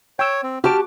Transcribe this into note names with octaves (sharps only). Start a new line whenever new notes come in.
C#5 G5 E6
C4
F#4 G4 A5 D6 F6